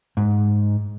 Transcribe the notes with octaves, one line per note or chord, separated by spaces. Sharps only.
G#2